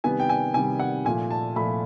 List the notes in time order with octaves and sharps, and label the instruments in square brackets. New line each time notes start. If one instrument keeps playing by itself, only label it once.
[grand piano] C3 D#3 G3 B3 [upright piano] G#5
[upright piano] G5
G#5
[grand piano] C3 D#3 G3 B3 [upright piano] G#5
[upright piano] F#5
[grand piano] A#2 F3 A3 [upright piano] G#5
[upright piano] A5
[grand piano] A#2 F3 A3 [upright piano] B5